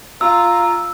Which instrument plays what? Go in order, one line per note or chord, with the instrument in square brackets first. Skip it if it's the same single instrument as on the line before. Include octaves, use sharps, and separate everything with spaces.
[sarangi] F4 [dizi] A#5 [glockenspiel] E6